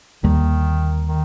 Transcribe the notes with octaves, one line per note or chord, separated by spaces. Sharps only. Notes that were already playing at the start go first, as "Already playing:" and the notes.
D#2 D3 D#3 G3 A#3
D#3